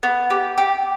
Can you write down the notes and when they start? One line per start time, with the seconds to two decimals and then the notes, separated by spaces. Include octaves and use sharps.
0.03 B3
0.30 G4
0.58 G4